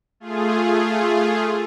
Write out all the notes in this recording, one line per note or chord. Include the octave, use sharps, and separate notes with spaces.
A3 F4 G#4